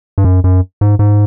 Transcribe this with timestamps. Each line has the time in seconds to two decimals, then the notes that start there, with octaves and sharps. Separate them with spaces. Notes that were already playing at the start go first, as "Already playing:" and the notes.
0.18 G2
0.24 F#2
0.44 F#2
0.81 G#2
0.99 G#2